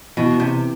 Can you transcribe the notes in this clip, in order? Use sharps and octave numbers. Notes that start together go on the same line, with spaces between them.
B2 E3
C3